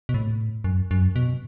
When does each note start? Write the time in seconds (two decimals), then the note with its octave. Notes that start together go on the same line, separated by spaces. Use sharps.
0.09 B2
0.14 A2
0.64 F#2
0.91 F#2
1.16 B2